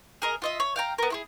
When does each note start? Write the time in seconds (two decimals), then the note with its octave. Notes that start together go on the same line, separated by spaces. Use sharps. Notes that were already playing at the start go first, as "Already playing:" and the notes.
0.22 G#4 A#4 D#5
0.42 F4 D#5 E5
0.60 C#5
0.76 F5 G5 A#5
0.98 B3 A#4
1.10 E4 F4 G#4